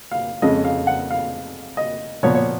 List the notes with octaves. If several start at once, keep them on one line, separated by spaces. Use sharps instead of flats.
F5
F2 C#3 G#3 D#5
F5
F#5
F5
D#5
A#2 F3 B3 C#5
C#5